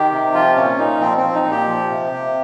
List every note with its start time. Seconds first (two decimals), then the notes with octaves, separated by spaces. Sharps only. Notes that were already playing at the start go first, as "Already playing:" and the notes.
Already playing: D#3 G4
0.12 C3
0.34 F3 F4
0.56 A#2 C#4
0.78 A#2 D#4
1.01 F3 C4
1.18 C4
1.23 F3
1.35 D#4
1.46 A#2
1.51 G4
1.68 F3
1.90 C3
2.12 C3